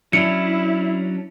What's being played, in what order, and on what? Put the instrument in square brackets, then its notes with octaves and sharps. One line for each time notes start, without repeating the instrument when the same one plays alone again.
[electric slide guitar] F#3 C#4 D4 [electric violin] E4 [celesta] C#7